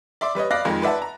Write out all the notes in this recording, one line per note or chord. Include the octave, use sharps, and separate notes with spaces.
D5 E5 C6 D6
G3 B4 C#5 D#5
D5 D#5 F5 B5 F#6 A#6
F2 D#3 G#3 D#4 F4
B4 D5 E5 F#5 A5
A#5